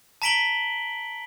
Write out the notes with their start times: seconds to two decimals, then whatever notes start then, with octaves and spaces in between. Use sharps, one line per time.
0.22 A5 A#5 B6 D7 F#7 G7